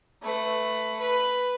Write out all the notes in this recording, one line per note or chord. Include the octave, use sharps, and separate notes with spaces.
A3 B4
B4